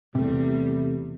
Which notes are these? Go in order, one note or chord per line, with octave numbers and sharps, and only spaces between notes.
E2 C3 G3 A3